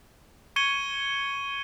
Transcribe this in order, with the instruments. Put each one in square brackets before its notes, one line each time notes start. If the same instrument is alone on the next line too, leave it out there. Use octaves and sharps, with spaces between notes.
[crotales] C#6 G#6 C#7 D#7 G7